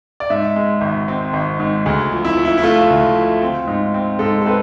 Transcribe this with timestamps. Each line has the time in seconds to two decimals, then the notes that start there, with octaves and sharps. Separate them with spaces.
0.20 D5
0.30 G#2 E5
0.56 G#3
0.81 G#1
1.08 C4
1.33 G#1
1.60 G#2
1.86 D2 G#4
2.12 F3
2.25 E4
2.37 F3
2.45 E4
2.58 E4
2.63 A3 F4
2.90 D2
3.15 F3
3.42 C4
3.67 G#2
3.94 C4
4.19 G#2 A4
4.42 A4
4.46 C4 B4